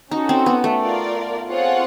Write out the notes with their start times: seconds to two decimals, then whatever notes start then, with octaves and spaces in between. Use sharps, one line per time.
0.11 C#4 D#4 F#4 A4
0.29 C4
0.46 B3
0.64 A3
0.81 F4 A#4 D5
1.49 C4 F4 G#4 C#5 F#5